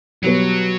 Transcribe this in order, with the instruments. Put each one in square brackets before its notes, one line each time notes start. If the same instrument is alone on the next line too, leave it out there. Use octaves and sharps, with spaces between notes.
[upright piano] B2 G3 B3 [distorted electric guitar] F#3